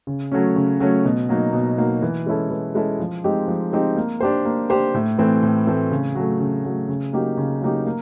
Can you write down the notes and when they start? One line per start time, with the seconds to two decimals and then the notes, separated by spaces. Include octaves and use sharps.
0.07 C#3
0.32 F#3 A3 C#4
0.56 C#3
0.80 F#3 A3 C#4
1.05 B2
1.29 F#3 A#3 D#4
1.53 B2
1.78 F#3 A#3 D#4
2.02 E3
2.26 G#3 C#4 E4 A4
2.51 E3
2.75 G#3 C#4 E4 A4
3.00 F3
3.24 G#3 C4 D#4 G4
3.48 F3
3.72 G#3 C4 D#4 G4
3.97 A#3
4.20 D4 G4 C5
4.45 A#3
4.70 D4 G4 C5
4.94 A2
5.18 E3 A3 C4
5.43 A2
5.67 E3 A3 C4
5.91 C#3
6.15 F#3 A3
6.40 C#3
6.65 F#3 A3
6.89 C#3
7.13 F#3 A#3 D#4 G4
7.37 C#3
7.62 F#3 A#3 D#4 G4
7.86 A#3